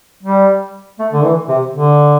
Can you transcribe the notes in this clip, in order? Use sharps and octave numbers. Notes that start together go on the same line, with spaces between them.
G3
A3
D3
E3
C3
D3